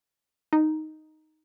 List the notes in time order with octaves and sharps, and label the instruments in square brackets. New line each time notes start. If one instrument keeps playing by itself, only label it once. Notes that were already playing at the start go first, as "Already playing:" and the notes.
[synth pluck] D#4